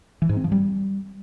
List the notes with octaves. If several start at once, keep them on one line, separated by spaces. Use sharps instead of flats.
E3
G#2
C4
F3
G3